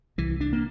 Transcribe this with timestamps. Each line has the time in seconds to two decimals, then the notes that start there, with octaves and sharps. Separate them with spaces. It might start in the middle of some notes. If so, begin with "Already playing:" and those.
0.18 C2 E3
0.41 D4
0.53 A#3